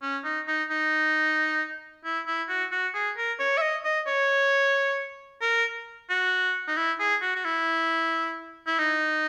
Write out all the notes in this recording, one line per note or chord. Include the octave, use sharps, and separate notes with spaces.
C#4
D#4
D#4
D#4
E4
E4
F#4
F#4
G#4
A#4
C#5
E5
D#5
D#5
C#5
A#4
F#4
D#4
E4
G#4
F#4
F#4
E4
E4
D#4